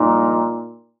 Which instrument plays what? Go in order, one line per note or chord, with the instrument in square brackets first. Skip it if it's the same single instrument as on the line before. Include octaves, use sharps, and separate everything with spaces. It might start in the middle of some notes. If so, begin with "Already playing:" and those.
Already playing: [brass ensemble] G2 F3 G#3 D#4 [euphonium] A#2